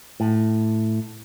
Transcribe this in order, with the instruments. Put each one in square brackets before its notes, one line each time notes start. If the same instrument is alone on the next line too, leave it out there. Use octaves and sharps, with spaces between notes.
[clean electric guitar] A2